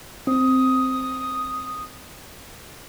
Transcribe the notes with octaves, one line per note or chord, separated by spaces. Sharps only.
C4 D#6